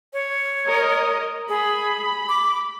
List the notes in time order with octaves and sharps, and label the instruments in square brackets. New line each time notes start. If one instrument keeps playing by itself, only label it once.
[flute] C#5
[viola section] A#4 D#5
[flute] G#4 [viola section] B5
[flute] D6